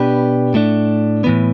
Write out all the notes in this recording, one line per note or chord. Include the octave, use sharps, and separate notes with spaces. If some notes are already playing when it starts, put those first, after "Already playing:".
Already playing: B2 B3 D4 G4 B4
A2 A3 D4
A2 E3 B3